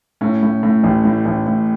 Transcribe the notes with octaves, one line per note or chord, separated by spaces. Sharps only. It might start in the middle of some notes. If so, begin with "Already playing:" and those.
A2 C#4
A2
A2
A1
A2
A1
A2